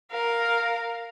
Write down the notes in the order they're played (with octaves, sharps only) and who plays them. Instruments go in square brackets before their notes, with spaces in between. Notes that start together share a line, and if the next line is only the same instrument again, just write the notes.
[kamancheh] A#4 F5